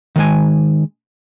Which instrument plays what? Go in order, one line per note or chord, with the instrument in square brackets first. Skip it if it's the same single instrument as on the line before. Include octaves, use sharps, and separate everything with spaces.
[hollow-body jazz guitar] D#3 G#3 G#5